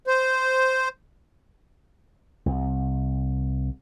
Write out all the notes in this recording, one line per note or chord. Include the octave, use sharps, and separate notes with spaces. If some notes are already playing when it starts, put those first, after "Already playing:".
C5
C2